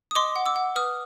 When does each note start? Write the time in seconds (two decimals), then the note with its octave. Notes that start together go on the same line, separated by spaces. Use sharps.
0.11 D#6
0.15 D#5 C6 D6
0.36 F#5
0.46 D6 E6
0.56 F#5
0.76 B4 D#6 F6